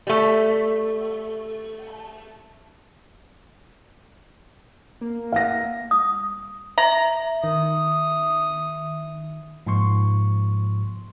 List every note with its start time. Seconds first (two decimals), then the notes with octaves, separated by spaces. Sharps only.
0.07 G3 A3
5.01 A#3
5.32 F5 F#5 A#6
5.91 D#6
6.78 E5 A#5
7.44 D#3 D#6
9.67 G#2 F3 A#3 C6 C#6